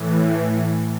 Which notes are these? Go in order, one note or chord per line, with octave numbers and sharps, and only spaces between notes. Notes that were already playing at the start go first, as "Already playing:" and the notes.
Already playing: A2 E3